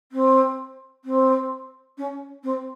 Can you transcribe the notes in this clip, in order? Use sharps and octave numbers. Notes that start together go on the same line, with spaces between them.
C4
C4
C#4
C4